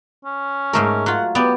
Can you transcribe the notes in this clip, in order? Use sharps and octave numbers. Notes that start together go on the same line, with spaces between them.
C#4
G#2 A3 A#4
F#3 F4 F#5
B3 G4 D5